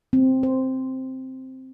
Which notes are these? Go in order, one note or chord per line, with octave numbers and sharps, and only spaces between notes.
C4
C5